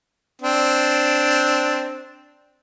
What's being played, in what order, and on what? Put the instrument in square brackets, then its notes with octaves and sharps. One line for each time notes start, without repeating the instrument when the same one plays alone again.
[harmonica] C4 D4